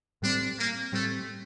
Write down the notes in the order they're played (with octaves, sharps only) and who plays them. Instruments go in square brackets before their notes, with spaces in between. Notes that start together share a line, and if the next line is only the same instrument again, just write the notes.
[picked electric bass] A2 G3 C4 [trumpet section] D4
[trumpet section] A#3
[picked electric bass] A2 G3 C4 [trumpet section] A3